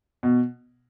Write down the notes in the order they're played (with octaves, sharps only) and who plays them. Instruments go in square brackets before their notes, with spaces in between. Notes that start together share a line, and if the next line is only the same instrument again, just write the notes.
[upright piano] B2